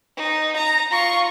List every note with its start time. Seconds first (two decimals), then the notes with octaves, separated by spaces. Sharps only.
0.17 D#4
0.57 A#5
0.91 F4 C#6